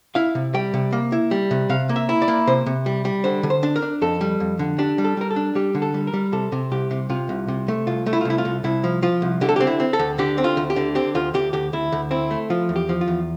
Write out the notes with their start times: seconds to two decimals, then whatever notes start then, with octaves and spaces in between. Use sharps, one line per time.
0.15 E4 F5
0.35 C3
0.54 G3 G5
0.74 C3
0.93 A#3
1.12 E4
1.31 G3
1.51 C3
1.69 C3 F5
1.89 A#3
1.96 E5
2.09 E4
2.22 D5
2.28 A#3
2.47 C3 C5
2.66 C3
2.86 G3
3.05 G3
3.24 D3 C5
3.43 D3
3.50 C5
3.63 D4
3.76 A#4
3.82 D4
4.02 F2 A4
4.21 G3
4.40 F2
4.59 D3
4.79 D4 G4
4.98 G3
5.04 A4
5.17 G3 A#4
5.31 A4
5.36 D4
5.55 G3 G4
5.75 D3
5.82 A4
5.94 G3
6.07 A#4
6.13 G3
6.33 C3 A4
6.52 C3
6.71 C2 G4
6.91 C3
7.10 C3 F4
7.29 C2
7.48 C3
7.68 A3
7.87 C2 F4
8.06 A3
8.13 E4
8.21 F4
8.25 C2 E4
8.38 F4
8.45 C2
8.64 C2 E4
8.84 F3
9.02 F3 F4
9.22 C2
9.41 D3 G4
9.49 A4
9.56 G4
9.60 C4
9.67 E4
9.80 C4
9.93 A4
9.99 D2
10.18 D3 G4
10.38 C4
10.44 F4
10.57 D2
10.70 G4
10.76 D3
10.95 C4 G4
11.15 D2 F4
11.34 D2 G4
11.53 D2 G4
11.73 D2 E4
11.92 D2
12.11 C4 E4
12.31 A3
12.50 F3 F4
12.69 E2
12.76 G4
12.89 F3
13.01 F4
13.08 E2